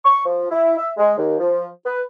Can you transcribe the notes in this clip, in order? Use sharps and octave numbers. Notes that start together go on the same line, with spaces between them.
C#6
F3
E4
E5
G#3
D#2
F3
B4